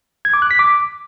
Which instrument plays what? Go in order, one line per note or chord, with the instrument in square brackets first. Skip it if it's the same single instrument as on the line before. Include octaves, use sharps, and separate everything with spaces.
[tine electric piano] G#6
D6
F#6
B6
D6